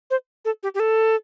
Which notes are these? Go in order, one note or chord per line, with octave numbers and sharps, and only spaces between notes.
C5
A4
G4
G4
A4